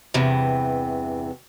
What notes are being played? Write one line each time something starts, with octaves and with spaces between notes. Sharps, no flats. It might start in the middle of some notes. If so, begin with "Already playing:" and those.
E2 G2 C3 E3